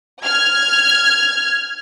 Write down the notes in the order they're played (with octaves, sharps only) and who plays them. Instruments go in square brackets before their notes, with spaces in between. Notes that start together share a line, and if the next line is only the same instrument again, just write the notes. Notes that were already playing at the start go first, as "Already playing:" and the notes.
[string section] F6 G#6